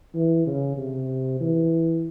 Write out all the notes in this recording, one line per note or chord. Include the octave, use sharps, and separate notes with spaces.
E3
C#3
C3
E3